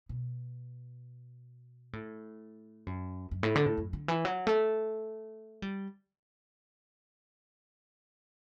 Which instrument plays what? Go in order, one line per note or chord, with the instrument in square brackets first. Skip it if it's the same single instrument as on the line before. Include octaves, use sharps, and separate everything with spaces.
[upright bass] B2
A2
F#2
F#2
A2
D3
A2
F#2
D3
E3
F#3
A3
G3